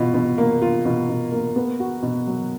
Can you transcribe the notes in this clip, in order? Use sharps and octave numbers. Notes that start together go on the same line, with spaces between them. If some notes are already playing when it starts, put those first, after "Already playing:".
Already playing: B2 F4
B2
A#3
F4
B2
B2
A#3
B3
F#4
B2
F#3